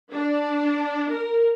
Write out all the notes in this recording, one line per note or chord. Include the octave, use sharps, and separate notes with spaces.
D4
A#4